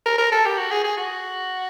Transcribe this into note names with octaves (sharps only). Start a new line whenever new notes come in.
A#4
A#4
A4
G4
F#4
G#4
G#4
F#4